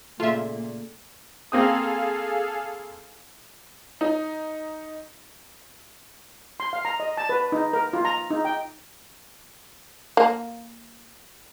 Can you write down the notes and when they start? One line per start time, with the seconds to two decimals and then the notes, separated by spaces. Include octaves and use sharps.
0.20 A#2 C#3 A3 F4 E5
1.52 A#3 C4 G#4 A4 F5 D#6
4.01 D#4
6.60 C6
6.73 F5
6.85 A#5
7.00 D#5
7.17 A5
7.29 B4
7.52 D#4
7.73 A#4
7.93 F4
8.05 A#5
8.30 D#4
8.45 G5
10.17 A#3